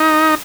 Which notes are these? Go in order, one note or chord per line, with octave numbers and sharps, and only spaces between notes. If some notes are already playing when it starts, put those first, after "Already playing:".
Already playing: D#4